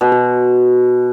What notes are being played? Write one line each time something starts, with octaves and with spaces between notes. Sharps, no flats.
B2
F#4